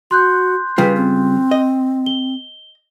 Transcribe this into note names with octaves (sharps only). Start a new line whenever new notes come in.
F#4 C6 F#6 G6
C#3 G3 F4 B4
C4
D#5
G7